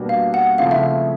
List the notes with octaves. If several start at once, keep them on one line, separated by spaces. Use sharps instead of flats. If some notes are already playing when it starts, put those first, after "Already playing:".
Already playing: B2 G3 A#3 D4 F#4
F5
F#5
C#3 F3 A3 C4 E4 F5
E5